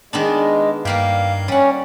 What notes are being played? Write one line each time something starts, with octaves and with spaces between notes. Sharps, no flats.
D#3 G#3 B3 D4
G2 G3 A#3 G4 F5
G3 C#4 F#5